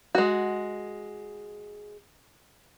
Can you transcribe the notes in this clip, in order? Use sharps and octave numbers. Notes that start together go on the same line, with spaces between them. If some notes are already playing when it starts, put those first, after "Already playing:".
G#3 F#4